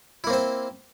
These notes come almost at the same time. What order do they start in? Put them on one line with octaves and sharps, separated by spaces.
E4 A#3 C4 C5